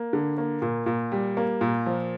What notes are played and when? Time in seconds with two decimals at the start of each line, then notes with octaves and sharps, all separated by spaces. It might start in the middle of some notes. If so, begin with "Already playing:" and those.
Already playing: A#3
0.13 D3
0.38 A#3
0.62 A#2
0.86 A#2
1.12 G3
1.37 A#3
1.61 A#2
1.86 F3